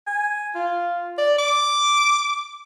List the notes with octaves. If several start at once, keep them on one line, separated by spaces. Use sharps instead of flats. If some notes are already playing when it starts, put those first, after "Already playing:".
G#5
F4
D5
D6